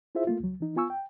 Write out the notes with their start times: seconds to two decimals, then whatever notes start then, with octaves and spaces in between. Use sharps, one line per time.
0.15 E4 F4 G#4 C5 E5
0.27 A3 A#3 F4
0.40 C#2 F#3
0.60 E3 D#4
0.76 B3 F4 G#5 C#6 E6
0.90 G5